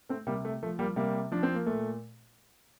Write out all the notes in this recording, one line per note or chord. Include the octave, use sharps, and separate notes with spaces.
A3 C4
C3 G3 A#3
A3
F3 A3
G3 A#3
C3 G3 A#3
F3 D4
C4
A#3
A#2 A3